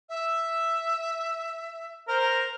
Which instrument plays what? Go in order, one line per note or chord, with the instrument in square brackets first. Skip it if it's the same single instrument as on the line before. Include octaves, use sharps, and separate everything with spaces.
[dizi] E5
[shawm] A#4 [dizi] C5